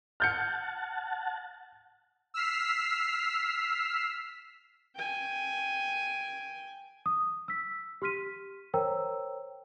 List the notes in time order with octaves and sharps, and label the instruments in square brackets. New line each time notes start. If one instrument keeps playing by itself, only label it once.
[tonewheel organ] F#5 A5 [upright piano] F6 G6 C#7
[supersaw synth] E6 F6 B6 C7
[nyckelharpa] G5 G#5
[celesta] D#6
E6 B6
G4 C6 F6 B6 D#7
A#4 C5 C#5 G5 A#5 E6